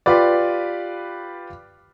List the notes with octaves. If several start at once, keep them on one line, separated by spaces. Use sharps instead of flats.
F4 G4 B4 D5